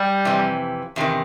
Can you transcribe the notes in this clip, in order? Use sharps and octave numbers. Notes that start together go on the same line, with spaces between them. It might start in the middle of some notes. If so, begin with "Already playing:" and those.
Already playing: G3
F2 C3 E3
E2 C3 D#3